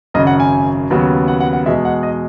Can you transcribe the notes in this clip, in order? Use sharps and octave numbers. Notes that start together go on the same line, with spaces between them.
G#1 F#2 C#3 D#5
F#5
G#5
D#2 C#3 F#3 B3
F#5
F#5
F#5
E2 B2 G#3 E5
F#5
D#5